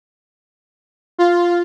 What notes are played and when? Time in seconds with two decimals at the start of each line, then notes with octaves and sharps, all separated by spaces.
1.18 F4